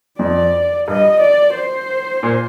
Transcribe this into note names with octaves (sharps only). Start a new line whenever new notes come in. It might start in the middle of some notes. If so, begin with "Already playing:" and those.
F2 D5
G2 D#5
D5
C5
A#2